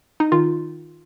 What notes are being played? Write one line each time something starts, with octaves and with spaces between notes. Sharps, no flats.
D#4
D#3 F4